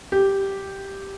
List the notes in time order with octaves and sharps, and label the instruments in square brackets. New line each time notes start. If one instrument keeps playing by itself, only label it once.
[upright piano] G4